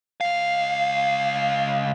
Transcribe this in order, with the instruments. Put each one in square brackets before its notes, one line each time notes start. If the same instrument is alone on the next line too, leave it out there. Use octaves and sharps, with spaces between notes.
[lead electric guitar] C#2 F5